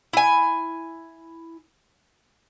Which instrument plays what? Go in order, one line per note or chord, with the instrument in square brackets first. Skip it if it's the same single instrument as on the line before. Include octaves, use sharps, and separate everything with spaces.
[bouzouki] E4 G#5